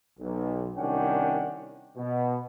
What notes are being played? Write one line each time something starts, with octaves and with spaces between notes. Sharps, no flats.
B1
C2 D#3 C#4 D4 F#5 G5
B2